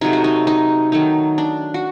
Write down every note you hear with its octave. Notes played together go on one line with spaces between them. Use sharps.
C3 F#3 A3 D#4
F#4
D#4
D#4
D#3 F#3 A3 D#4
D4
F#4